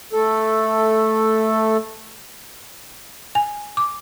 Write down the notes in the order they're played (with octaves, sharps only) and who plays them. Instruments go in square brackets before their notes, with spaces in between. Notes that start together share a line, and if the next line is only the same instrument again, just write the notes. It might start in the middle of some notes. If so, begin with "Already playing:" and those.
[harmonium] A3 A4
[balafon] G#5
D6